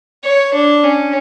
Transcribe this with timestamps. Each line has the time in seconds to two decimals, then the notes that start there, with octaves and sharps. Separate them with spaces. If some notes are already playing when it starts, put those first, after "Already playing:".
0.23 C#5
0.53 D4
0.83 C#4